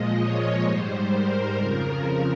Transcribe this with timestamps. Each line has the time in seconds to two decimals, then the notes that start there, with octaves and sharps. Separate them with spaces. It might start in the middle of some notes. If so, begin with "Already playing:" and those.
Already playing: A#2 F3 G#3 D#5
0.16 C#5
0.63 G#2 G3 C5
1.09 A#4
1.55 F2 C#3 F3 A#4